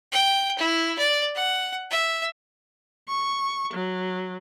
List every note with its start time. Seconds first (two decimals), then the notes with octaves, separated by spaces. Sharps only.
0.12 G5
0.58 E4
0.98 D5
1.35 F#5
1.91 E5
3.08 C#6
3.74 F#3